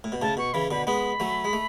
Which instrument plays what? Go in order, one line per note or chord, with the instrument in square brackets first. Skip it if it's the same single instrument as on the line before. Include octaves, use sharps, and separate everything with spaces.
[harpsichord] A2
B2
[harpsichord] A2 C#3 [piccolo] A5
[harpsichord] B2 [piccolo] C#6
[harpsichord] C#3 E3 [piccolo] B5
[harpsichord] B2 D3 [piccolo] B5
[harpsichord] G#3 B3 [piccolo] B5
[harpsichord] F#3 A3
G#3
A3